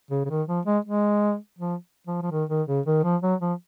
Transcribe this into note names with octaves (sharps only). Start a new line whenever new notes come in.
C#3
C#3
D#3
F3
G#3
G#3
F3
F3
F3
D#3
D#3
C#3
D#3
F3
F#3
F3